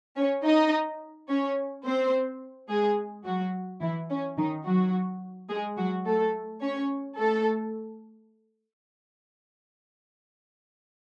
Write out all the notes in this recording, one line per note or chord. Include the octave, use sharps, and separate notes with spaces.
C#4 C#5
D#4 D#5
C#4 C#5
C4 C5
G#3 G#4
F#3 F#4
E3 E4
C#4
D#3 D#4
F#3 F#4
G#3 G#4
F#3 F#4
A3 A4
C#4 C#5
A3 A4